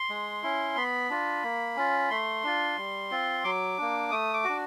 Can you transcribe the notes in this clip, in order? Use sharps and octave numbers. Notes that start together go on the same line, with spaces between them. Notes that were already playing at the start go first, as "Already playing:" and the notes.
Already playing: C6
G#3
C#4 E4
B3 B5
D4 F4
A#3
C#4 F4
A3 C6
D4 F4
G3
C4 F4
F#3 D6
A#3 D4
A3 D#6
D6
D4 F#4